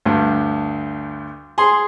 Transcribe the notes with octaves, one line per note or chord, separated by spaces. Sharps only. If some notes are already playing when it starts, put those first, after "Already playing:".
D2 G2
G#4 C6